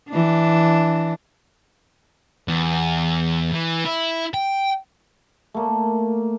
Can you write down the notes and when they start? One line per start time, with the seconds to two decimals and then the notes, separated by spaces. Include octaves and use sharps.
0.10 E3 D4
2.48 E2
3.53 E3
3.85 E4
4.34 G5
5.54 A3 A#3